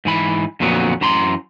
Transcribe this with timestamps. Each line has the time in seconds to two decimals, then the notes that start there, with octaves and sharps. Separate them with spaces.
0.05 G#2 E3 B5
0.60 F2 A#2 D3 F#3 B3
1.01 F#2 E3 A#5 C6